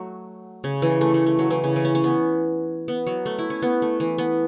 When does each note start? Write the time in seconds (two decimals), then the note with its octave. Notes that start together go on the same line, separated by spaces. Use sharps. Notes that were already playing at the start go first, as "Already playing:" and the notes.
Already playing: F#3 A3
0.64 C#3
0.82 E3
1.01 A3
1.14 A3
1.26 A3
1.39 F#3
1.50 E3
1.64 C#3
1.76 E3
1.85 C#4
1.95 C#4
2.04 B3
2.88 B3
3.07 F#3
3.26 A3
3.39 E4
3.50 C#4
3.62 B3
3.82 A3
4.00 E3
4.18 B3